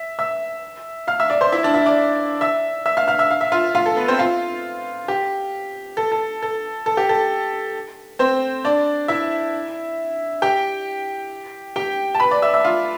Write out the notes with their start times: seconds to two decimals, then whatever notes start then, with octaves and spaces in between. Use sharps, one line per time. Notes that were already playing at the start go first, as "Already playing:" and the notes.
Already playing: E5
0.19 E5 E6
1.08 F5 F6
1.20 E5 E6
1.30 D5 D6
1.41 C5 C6
1.52 E4 E5
1.63 D4 D5
1.74 E4 E5
1.86 D5 D6
2.41 E5 E6
2.86 E5 E6
2.97 F5 F6
3.08 F5 F6
3.19 E5 E6
3.31 F5
3.41 E5
3.52 F4 F5
3.75 F4 F5
3.86 A4
3.97 B3 B4
4.08 C4 C5
4.19 F4 F5
5.08 G4
5.97 A4
6.12 A4
6.42 A4
6.86 A4
6.97 G4
7.09 A4
8.19 C4 C5
8.65 D4 D5
9.08 E4 E5
10.42 G4 G5
11.76 G4 G5
12.15 A5
12.20 B4 B5
12.31 D5 D6
12.42 E5 E6
12.54 E5 E6
12.64 F4 F5